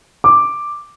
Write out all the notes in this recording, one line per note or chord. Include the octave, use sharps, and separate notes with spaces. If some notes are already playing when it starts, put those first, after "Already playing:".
D6